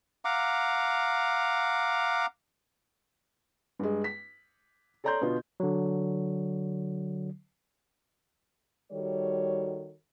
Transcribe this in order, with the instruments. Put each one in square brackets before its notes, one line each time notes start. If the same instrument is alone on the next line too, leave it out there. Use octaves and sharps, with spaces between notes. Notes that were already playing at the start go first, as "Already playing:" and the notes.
[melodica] F5 F#5 A#5 D6
[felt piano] G2 G#3
B6
A4 C#5 D5 A#5 C6 G6
B2 D3 B3 F4
[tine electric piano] D3 F#3
[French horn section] D#3 G3 F#4 A4 C#5